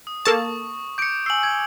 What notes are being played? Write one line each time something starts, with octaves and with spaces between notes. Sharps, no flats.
D#6
A#3 A4 A5 C#6
D6 G6 C#7 D7
G#5 E6 C7 F#7
G#6